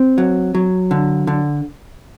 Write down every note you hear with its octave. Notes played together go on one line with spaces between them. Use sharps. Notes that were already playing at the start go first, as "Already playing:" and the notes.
Already playing: C4
F#3
F#3
D3
D3